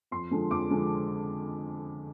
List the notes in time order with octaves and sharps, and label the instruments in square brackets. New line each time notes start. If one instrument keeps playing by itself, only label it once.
[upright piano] F2 C6
D3 F3 G#3
F2 D6
D3 F3 G#3